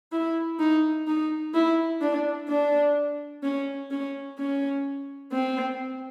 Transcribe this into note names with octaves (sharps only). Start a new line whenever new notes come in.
E4
D#4
D#4
E4
D4
D4
C#4
C#4
C#4
C4